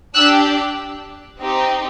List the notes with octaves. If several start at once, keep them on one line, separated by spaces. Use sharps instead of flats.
D4 G4 E6 F#6
C4 D#4 G4